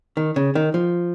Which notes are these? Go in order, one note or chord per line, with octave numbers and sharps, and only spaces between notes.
D#3
C#3
D#3
F3